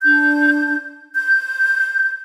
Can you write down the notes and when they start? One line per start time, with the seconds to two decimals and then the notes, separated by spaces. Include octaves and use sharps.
0.02 D4 G6
1.15 G6